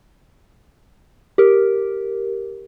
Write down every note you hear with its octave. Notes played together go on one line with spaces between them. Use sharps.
G4 A#4